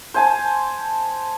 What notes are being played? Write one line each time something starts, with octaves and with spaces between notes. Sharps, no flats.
C5 G#5 A5